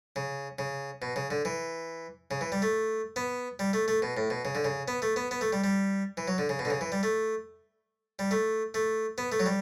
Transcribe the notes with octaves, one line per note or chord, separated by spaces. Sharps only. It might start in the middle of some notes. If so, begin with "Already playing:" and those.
C#3
C#3
B2
C#3
D3
E3
C#3
E3
G3
A3
B3
G3
A3
A3
B2
A2
B2
C#3
D3
C#3
B3
A3
B3
B3
A3
G3
G3
E3
F#3
D3
C#3
B2
D3
C#3
E3
G3
A3
G3
A3
A3
B3
A3
F#3
G3